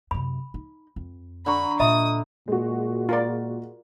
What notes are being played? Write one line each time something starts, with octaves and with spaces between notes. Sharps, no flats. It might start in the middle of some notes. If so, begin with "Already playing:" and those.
F#2 C3 B5
D#4
F2
D3 A#5 B5 C#6
A#2 D#5 E5 B5 D#6
A#2 G#3 F#4
F4 A#4 D5